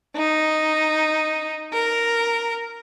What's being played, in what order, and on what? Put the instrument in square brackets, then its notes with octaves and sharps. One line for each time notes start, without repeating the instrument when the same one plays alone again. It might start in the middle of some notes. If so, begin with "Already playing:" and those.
[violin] D#4
A#4